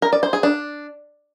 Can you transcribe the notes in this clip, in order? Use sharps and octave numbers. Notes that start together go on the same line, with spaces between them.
A#4
D5
C5
G#4
D4